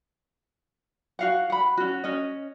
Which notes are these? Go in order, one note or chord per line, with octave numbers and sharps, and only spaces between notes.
F#4 F5 F#5
F#5 B5
C#4 F#4
C#4 D#5